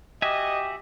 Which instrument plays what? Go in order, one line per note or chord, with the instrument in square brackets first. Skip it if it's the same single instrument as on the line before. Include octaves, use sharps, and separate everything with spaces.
[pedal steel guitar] F#4 E5 G#5 [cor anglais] G4 [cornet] D#5